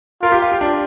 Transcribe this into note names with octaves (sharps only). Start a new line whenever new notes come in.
F4 A#4
G4
F4
G4
D4